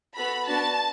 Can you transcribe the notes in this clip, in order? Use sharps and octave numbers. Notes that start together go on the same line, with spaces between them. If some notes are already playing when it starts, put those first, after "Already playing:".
B3 F#4 A4 B5
B3 D4 F#4 A5